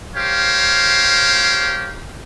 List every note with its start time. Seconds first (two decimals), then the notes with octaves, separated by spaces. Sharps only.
0.15 G4 A#4 C5 C#5 F5